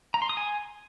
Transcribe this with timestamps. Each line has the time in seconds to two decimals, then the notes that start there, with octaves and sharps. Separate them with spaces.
0.14 A#5
0.22 C6
0.29 D#6
0.37 G#5